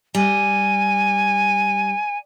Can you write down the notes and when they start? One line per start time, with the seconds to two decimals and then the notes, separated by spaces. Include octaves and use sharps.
0.15 G3 G#5